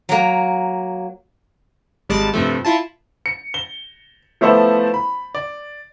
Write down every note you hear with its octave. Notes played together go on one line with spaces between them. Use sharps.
F#3 A#3
G#1 G3 G#3 A5 D6
G2 C3 F3 A3
E4 F4 A5
C#7
G7
F3 A3 B3 E4 A4 C5
B5
D5